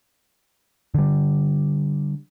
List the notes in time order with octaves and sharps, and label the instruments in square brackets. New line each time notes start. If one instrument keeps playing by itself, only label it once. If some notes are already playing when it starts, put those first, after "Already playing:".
[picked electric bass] D3 G3